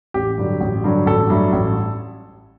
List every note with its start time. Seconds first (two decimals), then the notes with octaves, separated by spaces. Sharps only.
0.14 A1 G4
0.38 G2 D3 F#3
0.61 A1
0.84 G2 D3 F#3
1.06 A1 A4
1.30 G2 F#3 A3
1.53 A1